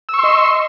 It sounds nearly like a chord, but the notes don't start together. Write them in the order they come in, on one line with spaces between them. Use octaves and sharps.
E6 C#6 C6 D#5